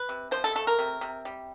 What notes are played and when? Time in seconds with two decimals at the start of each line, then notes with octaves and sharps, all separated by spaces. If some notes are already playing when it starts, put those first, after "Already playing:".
Already playing: B4
0.09 C3
0.31 F3 C5
0.44 A4
0.55 A3 A4
0.67 A#4
0.79 C3
1.01 C3
1.25 G3